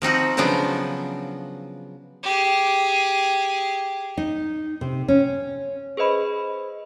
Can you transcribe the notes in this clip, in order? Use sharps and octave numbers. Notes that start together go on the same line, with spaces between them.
F3 C4 D#4 F#4
C#3 F3 F#3 B3 D4
G4 G#4
D#4
C3
C#4
G#4 B4 C5 D#5 B5